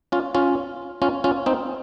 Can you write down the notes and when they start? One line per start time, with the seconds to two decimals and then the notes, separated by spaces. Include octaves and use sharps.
0.12 C#4 F4
0.35 C#4 F4
1.02 C#4 F4
1.24 C#4 F4
1.46 C4 D#4